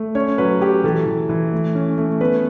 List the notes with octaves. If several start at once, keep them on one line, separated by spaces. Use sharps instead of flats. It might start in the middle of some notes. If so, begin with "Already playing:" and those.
Already playing: A3
C#4 C#5
F#3 B4
F#3 G4
E3 A4
E3
E3
A3
C#4
A3
B3 B4